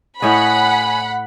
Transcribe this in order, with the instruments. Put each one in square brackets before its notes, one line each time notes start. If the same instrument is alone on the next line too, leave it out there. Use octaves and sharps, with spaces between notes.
[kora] A2 C#5 D#5 [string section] F#5 [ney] G#5 [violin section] B5